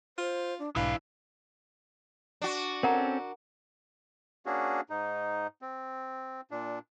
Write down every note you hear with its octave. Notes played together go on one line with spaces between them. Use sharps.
F4 C5
D4
B1 G#2 E3 D4 E4 F5
D4 F#4
C4 C#4 A4 A#4 F#5 A#5
A#3 C#4 D4 F#4 G#4
G#2 D#4
C4
A#2 D4